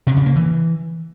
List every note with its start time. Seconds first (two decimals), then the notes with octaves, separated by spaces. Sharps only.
0.07 C3
0.16 C#3
0.26 A#3
0.36 E3